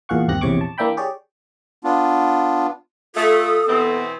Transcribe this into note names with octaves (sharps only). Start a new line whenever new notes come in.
E2 A#2 G#4 F5 F#5 C#6
G1 D#2 C3 G4 F#6 A#6
A#1 E2 C3 C#5 C#6 D6
A5
E3 A#3 D4 E5 G5 B5
G4 G#4 C#5 D5
B3 D4 F4
A3 F4 A4 D#6
B2 E3 B3 C4